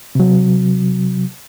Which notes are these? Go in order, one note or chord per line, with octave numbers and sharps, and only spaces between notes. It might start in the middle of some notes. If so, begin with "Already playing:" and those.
C3 F#3